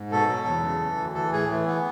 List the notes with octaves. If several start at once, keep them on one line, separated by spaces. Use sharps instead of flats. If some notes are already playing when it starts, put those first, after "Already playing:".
Already playing: G#2
B2 A4
F#3
E2
C#3
E3
D2
E3 A4
A2 G#4
E3 A3
B3